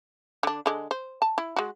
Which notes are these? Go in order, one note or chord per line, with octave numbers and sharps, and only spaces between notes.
D3 D4
D3 G#3
C5
A5
E4
G#3 F#4